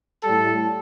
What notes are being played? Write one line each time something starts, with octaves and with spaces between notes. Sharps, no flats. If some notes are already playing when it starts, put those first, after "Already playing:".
A2 G3 A4